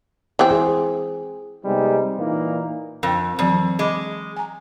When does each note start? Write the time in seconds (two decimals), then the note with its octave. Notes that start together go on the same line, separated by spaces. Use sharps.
0.39 E3 C4
0.51 G#4
1.65 C3 G3 G#3 B3 C4 D#4
2.17 A#2 E3 A#3 D#4
3.03 F2 A#4 G5
3.39 F2 E3 F#3 C4
3.79 G#3 D#5 B5 D6
4.37 G#5 A#5